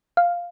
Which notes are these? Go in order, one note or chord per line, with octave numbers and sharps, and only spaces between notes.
F5